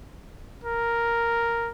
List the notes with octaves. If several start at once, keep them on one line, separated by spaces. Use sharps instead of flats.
A#4